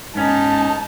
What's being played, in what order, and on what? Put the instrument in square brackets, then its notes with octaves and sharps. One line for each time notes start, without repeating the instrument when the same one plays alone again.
[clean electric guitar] G#2 B3 C#4 [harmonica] D#4 [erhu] A5